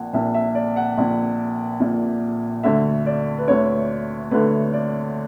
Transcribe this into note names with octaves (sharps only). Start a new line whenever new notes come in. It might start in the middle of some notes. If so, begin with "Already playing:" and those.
Already playing: A#1 A#2 F#5
A#1 A#2 E5
E5
D5
F#5
A#1 A#2
A#1 A#2
D2 D3 E5
D5
B4
D2 D3 C#5
D2 D3 B4
D5